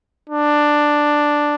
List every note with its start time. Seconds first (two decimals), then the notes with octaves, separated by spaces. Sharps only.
0.30 D4